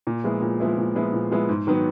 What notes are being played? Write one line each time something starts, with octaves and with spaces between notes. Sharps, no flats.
A#2
F3 G#3 B3 E4
A#2
F3 G#3 B3 E4
A#2
F3 G#3 B3 E4
A#2
F3 G#3 B3 E4
G#2
D#3 F#3 B3